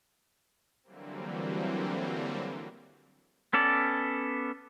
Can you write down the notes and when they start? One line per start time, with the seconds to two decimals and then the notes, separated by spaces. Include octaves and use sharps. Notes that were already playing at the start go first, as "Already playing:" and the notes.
0.83 D3 E3 F#3 G3 A#3 C4
3.53 B3 C#4 A4 D5